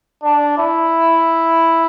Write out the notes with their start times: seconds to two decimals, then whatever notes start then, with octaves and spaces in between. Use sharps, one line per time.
0.23 D4
0.58 E4